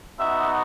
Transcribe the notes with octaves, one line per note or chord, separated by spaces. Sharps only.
B3 D#4 F#4 E5